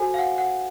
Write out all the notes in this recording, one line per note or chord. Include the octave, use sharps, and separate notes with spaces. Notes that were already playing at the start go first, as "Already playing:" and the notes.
Already playing: F#4 A4 C5 G#5
F5
F#5
F#5